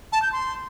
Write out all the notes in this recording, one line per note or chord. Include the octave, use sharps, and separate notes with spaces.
A5
G6
C6